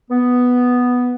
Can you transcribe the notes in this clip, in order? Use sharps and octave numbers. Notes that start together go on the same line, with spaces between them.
B3